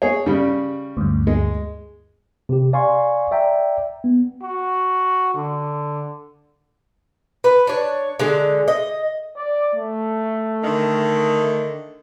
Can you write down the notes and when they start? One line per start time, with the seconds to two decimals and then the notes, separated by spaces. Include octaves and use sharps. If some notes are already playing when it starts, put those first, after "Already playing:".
0.02 G#4 C#5
0.26 C#3 G3
0.97 D2 G2
1.27 G#3
2.49 C3 G4
2.73 D5 F5 G#5 C6 C#6
3.31 D5 E5 G5 A#5
4.04 B3
4.42 F#4
5.35 D3
7.44 B4
7.67 D4 C#5
8.19 D3 G#3
8.68 D#5
9.36 D5
9.75 A3
10.63 D3 D#3